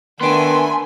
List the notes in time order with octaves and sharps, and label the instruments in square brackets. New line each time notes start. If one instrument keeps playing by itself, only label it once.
[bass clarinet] D#3 [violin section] A3 G#5 B5 [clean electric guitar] B3 D4 [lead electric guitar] C6